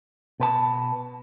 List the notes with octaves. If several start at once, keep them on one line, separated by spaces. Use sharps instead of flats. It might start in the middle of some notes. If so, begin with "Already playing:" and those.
B2 B4 A5